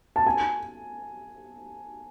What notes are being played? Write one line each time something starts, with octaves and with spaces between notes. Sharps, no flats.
A5
G#5